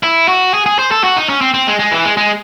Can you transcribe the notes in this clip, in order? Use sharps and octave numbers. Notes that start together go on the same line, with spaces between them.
E4
F#4
G#4
G#4
C5
A4
F#4
D#4
C#4
C4
C4
G#3
G#3
E3
G#3
G#3